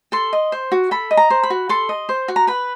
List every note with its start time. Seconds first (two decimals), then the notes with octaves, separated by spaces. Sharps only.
0.12 A4 C6
0.33 D#5
0.52 C5
0.72 F#4
0.91 A4 B5
1.11 D#5
1.17 A#5
1.30 C5
1.43 B5
1.50 F#4
1.69 A4 C6
1.89 D#5
2.09 C5
2.28 F#4
2.36 A#5
2.47 B4 B5